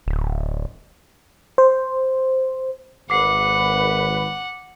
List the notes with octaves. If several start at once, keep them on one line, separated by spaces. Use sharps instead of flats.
D1
C5
G#1 B4 F#5 D6 C7